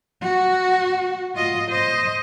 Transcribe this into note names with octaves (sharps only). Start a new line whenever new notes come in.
F#4
F4 D#5
C5 D#5